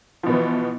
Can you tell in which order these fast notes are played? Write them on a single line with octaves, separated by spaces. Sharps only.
F3 B2 B3 E3